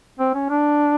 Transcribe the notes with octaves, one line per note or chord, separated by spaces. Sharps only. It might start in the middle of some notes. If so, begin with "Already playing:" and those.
C4
C#4
D4